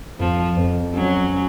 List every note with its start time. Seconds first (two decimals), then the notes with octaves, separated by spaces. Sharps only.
0.19 F2 F3
0.57 F2
0.94 F#3 C#4
1.33 C#4